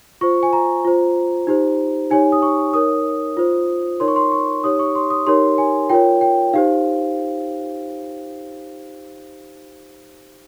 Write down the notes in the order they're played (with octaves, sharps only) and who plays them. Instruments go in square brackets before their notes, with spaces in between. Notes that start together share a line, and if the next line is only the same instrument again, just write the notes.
[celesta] F4 C5 C#6
G#5
A#5
F4 C5
D#4 G4 C5
D#4 G4 C#5 G#5
D#6
C#6
D#4 A#4 C#5 D#6
F4 C5
D#4 A#4 C#5 C6
C#6
C6
C#6
D#4 G4 C#5 D#6
C#6
C6
D#6
D#4 G4 A#4 C#5 C6
G#5
F4 A#4 C#5 G5
G5
D#4 G4 C5 F5